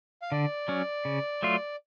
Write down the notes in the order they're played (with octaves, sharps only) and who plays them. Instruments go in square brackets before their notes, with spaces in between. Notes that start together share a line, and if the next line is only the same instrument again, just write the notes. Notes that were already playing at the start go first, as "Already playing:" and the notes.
[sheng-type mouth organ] F5
[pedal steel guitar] D3 [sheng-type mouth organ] D5
[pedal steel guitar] F#3 C#4
C#3
F#3 A3 F4